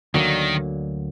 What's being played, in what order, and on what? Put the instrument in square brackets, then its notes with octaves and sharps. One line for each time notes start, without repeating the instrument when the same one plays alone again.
[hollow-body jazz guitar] D2 D3 F#3 A#3 [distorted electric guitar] D#3